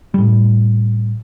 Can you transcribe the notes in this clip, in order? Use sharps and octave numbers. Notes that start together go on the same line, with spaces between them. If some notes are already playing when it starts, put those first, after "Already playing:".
A2 G3